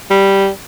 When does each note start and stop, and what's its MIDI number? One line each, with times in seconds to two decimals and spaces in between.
0.11 0.49 55